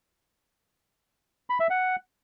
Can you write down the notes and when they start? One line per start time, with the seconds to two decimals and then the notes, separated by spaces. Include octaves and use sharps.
1.50 B5
1.60 E5
1.70 F#5